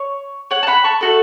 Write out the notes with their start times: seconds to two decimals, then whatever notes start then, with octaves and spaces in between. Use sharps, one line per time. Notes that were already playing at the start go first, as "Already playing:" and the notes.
Already playing: C#5
0.51 C#5 F#5
0.63 A5
0.67 F#5 B5
0.84 A5 C#6
1.01 A3 F#4 A4